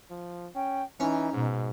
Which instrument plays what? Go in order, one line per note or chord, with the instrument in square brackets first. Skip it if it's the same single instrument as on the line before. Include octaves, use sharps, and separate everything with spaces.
[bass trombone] F3
[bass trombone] C#4 [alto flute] G5
[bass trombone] E3 [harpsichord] C#4 [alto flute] D#4
[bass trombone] G#2 [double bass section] B2